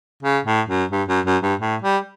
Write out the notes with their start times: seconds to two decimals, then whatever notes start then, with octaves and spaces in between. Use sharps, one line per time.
0.23 C#3
0.45 A2
0.69 F#2
0.91 G2
1.08 F#2
1.26 F#2
1.43 G2
1.60 A2
1.82 G3